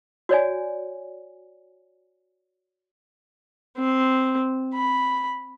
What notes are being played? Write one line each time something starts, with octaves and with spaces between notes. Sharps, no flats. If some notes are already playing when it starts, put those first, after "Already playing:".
F#4 C#5 D5 G#5
C4
B5